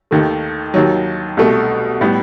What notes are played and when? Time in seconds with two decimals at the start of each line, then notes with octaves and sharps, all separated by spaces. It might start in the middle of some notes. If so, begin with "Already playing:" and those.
0.11 D#2 D#3 A3
0.74 D#2 D#3 F#3
1.37 C2 B2 A3
2.01 A2 G3 B3